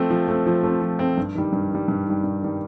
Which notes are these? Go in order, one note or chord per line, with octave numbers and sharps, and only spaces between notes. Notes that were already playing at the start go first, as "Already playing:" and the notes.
Already playing: F3 A3 C4
F3
A3 C4
F3
A3 C4
F3
A3 C4
G2
D#3 G3
G2
D#3 G3
G2
D#3 G3
G2
D#3 G3